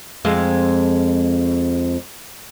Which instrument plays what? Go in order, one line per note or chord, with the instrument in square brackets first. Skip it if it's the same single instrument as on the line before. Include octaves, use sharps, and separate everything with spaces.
[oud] F2 G#3